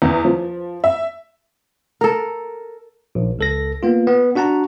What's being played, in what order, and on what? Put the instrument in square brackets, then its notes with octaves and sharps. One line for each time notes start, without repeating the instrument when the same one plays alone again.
[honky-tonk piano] E2
F3
E5
[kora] A4 A#4
[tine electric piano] A#1
C#2 A4 A#6
A#3 B3 F4
B3
D4 F#4 F#5 A5 A#5